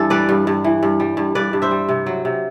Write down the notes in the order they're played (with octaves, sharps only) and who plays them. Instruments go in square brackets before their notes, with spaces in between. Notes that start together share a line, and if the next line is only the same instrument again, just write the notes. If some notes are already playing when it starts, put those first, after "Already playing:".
Already playing: [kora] G2 E3 A4
G3 B4 D5
G2
G2
E3
G2
G3
G2
G2 B4 D5
G2
C5 E5
G3
C3
F#3
C3